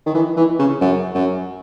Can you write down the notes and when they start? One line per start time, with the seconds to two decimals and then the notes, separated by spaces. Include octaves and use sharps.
0.06 D#3
0.14 E3
0.37 E3
0.59 C#3
0.81 F#2
1.15 F#2